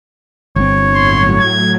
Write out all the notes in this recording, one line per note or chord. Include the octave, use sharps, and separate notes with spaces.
G1 C4 C#5
A2 F#3 C6
G#6